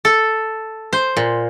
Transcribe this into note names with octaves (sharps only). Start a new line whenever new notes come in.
A4
C5
A#2